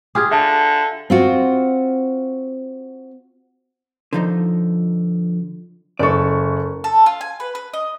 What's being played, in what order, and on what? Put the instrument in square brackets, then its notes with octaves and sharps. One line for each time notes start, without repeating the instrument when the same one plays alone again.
[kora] F4 G4 G#4 [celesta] D#6 F6 G#6
[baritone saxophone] D3 [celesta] E5 A5
[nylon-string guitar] C4 F4 F#4
[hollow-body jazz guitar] D3 F3 D#4
[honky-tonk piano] F#1 C#6 [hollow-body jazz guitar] A4 D5
[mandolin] A4
F4
G#5
B4
B4
D#5